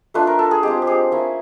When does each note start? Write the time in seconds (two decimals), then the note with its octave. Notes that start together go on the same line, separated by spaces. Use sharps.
0.14 A3 D4 F4 B4
0.27 A#4
0.39 A4
0.51 G#4
0.63 G#3 C4 F4 G4
0.82 G4
0.87 G#4
1.12 A#3 C#4 E4